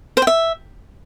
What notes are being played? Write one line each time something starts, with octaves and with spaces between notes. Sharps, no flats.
C5
G5
E5